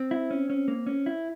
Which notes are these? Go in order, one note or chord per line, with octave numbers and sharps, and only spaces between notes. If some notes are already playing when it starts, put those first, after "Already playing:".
Already playing: C4
E4
C#4
C#4
A#3
C#4
E4